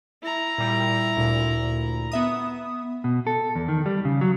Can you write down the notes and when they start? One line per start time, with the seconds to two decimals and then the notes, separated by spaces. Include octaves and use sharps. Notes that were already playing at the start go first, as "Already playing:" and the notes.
0.22 E4 A#5
0.58 A#2 G3
1.17 D2 A#2
2.12 B3 E5 D#6
3.04 B2
3.27 A4
3.55 E2
3.68 D#3
3.86 G3
4.05 C#3
4.21 F#3